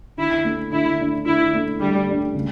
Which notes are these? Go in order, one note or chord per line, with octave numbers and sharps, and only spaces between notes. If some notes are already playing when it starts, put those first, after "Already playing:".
D3 E4
A3 D4
D3 E4
A3 D4
D3 E4
A3 D4
D3 G3
A3 D4
C#3